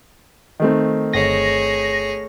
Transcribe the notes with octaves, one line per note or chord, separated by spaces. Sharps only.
D#3 A3 C4
G1 G#4 C#5 A#6